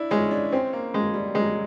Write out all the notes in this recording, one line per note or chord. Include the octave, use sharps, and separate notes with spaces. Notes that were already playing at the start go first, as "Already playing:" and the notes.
Already playing: D4 E4
G#3 C#4
D4
C4 C#4
A#3
G#3
G3
G3
F#3 G#3